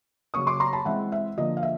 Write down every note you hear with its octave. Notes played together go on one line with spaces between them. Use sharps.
C#3 F#3 A#3 C#6 D#6
C6 D6
A#5 C6
A5 B5
E3 G#3 C4 E5 F#5
E5
D3 F3 A#3 D#5
F5
E5